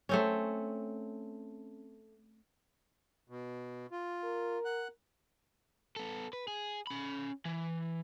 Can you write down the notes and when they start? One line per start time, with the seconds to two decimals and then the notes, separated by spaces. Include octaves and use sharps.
0.09 A3 C4 C#4
3.29 B2
3.92 F4
4.24 A#4
4.65 F#5 F#6
5.96 B3 A4
6.33 B4
6.48 G#4
6.87 C#4 B5
7.45 E3